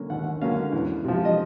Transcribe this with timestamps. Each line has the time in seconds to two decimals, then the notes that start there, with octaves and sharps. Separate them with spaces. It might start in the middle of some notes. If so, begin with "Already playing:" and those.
Already playing: D3 F#3 A#3 C#4
0.10 D#2 F#5
0.42 D3 F#3 A#3 C#4 F5
0.73 E2
1.04 C3 F3
1.25 D#5